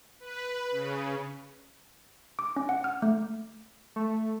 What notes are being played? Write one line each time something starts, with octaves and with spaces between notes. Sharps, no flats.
B4
C#3
D6
C#4
F#5
F6
A3
A3